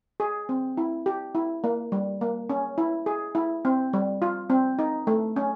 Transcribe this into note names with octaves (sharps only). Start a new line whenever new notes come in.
G#4
C4
E4
G4
E4
A#3
G3
A#3
C#4
E4
G#4
E4
C4
G3
F4
C4
D#4
A3
C#4